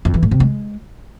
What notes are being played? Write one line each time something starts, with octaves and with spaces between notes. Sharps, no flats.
F2
E3
A2
C3
G#3